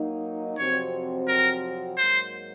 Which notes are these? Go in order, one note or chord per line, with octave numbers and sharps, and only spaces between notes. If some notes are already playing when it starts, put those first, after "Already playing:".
Already playing: F#3 A#3 D#4
F2 C3 F#3 C4 F#4 C#5
A#4
G#2 F#3 A#3 C5